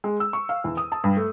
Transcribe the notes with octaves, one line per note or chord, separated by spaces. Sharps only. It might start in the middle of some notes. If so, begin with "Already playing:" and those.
G#3
E6
C#6
F5
E2
D#6
A5
G2
A3